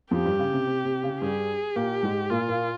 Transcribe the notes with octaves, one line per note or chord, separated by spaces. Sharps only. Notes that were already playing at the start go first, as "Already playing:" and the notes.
F2 F3 G4
G2 G3
C#3
C3
C3
C3
C#3
G2 G3 G#4
A#2 A#3 G4
G#2 G#3
A#2 A#3 F4
A#2 A#3